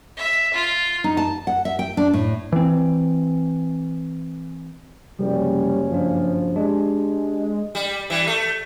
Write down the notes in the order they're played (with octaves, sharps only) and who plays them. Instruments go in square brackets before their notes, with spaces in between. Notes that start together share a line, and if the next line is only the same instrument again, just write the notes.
[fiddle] E5
F4
[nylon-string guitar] D#4
A5
F#5
E5
G5
D4
A2
[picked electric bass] E3 C4
[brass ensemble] F#1 C#4 [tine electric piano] C3 F3 [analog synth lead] G3
[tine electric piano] G2 D4 [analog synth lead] F3
[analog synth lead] G#3 [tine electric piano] D4 G4
[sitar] G3
E3 G3
A3